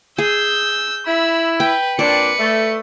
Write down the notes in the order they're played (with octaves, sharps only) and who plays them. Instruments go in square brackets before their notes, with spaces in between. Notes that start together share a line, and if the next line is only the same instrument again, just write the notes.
[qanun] G#4 [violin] E6 G6
[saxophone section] E4 [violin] B5 E6
[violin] B4 [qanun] G5
[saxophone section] A#2 C4 D4 [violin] B4 C#7 [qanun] D5
[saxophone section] A3